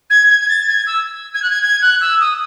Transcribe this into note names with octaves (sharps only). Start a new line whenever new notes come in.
G#6
G#6
G#6
A6
G#6
E6
G#6
F#6
G#6
G#6
F#6
E6
D#6